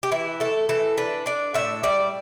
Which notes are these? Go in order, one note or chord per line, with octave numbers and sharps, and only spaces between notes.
G4
E3 E4
A3 A4
E3 A4
D4 B4
D4 D5
A2 E5
G3 D5